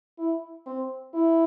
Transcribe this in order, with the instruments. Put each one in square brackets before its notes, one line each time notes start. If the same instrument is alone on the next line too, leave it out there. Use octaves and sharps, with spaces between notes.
[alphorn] E4
C4
E4